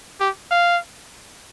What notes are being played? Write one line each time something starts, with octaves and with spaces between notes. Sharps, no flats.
G4
F5